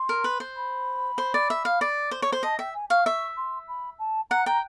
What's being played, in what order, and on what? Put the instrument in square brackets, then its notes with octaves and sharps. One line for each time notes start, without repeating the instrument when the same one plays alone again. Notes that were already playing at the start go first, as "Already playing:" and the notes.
Already playing: [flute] C6
[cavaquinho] A#4
B4
C5
[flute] B5
[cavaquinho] C5
D5
E5
F5
D5
C5
C#5
C5
[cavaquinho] D#5 [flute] A5
[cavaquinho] E5 [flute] G5
[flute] G#5
[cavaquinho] F5 [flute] C#6
[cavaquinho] E5 [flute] C#6
[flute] C6
B5
A5
[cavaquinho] F#5 [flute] A#5
[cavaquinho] G5 [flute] A#5